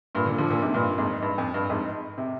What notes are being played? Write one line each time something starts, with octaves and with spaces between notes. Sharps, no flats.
G2 A#2
A#2 D3
D3 F3
A#2 D3
G#2 C3
G2 A#2
F2 G#2
G2
F2
G2
F2 G#2
C3